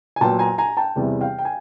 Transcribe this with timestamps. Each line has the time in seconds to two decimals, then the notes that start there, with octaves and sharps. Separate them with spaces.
0.16 G#5
0.21 A#2 F#3 B3 G5 A5
0.39 G#5 A#5
0.58 G#5 A#5
0.77 G5 A5
0.96 E2 C3 E3 G3
1.21 F5 G5
1.39 G5
1.45 G#5